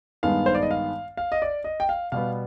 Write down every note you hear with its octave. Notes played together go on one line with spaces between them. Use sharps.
G2 D#3 G#3 B3 F5
C5
D5
D#5
F5
F5
D#5
D5
D#5
G5
F5
B2 G3 B3 F5